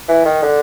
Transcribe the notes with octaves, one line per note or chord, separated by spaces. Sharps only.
E3
D#3
D3